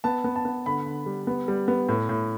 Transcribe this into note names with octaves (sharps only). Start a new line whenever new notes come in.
B3 A5
B3
A5
B3
D3 B5
D3
G3
B3
G3
B3
A2
A2